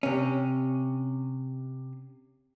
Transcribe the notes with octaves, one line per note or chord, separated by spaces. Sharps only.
C3 C#4